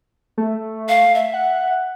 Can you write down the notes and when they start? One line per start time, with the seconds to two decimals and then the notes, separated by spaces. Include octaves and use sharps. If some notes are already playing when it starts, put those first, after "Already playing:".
0.38 A3
0.88 F5
1.15 E5
1.33 F#5